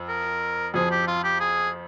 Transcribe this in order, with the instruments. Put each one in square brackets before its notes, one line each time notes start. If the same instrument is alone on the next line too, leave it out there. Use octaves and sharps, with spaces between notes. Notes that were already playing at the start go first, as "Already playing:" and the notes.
Already playing: [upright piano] F2
[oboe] A#4
[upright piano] F2 F3 [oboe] G#4
[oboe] G4
F4
G4
G#4